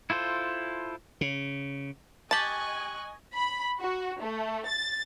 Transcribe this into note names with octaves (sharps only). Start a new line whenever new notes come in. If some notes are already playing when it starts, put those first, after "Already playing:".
E4 F4 A4 C5
C#3
G4 D#5 G#5 A5 C#6 F#6 A6 F#7
B5
F#4
A3
A6